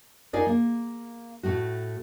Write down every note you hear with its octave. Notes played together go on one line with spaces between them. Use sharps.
D#4 F4 G#4 A#4 D5
A#3
A2 A3 F#4